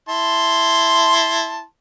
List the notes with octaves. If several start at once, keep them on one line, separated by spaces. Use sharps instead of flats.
E4 A5 C6